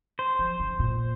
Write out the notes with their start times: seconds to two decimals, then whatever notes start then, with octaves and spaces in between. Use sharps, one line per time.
0.19 C5
0.39 F3
0.60 C#3
0.79 A#2